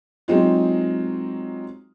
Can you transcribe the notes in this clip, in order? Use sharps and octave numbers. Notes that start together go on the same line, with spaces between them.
F#3 G#3 C4 D#4 F4